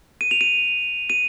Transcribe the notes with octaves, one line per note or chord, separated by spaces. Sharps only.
D#7
F7
D#7
D#7